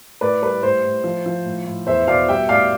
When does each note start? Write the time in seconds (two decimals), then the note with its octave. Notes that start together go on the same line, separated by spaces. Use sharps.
0.21 A2 B4 D5
0.42 G3 B4
0.63 A2 C5
0.84 A2
1.04 F3
1.26 F3
1.45 A2
1.66 A2
1.87 E2 C5 E5
2.07 B2 D5 F5
2.28 G3 E5 G5
2.49 A2 D5 F5